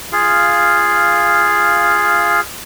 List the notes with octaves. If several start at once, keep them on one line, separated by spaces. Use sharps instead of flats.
F4 G#4 F5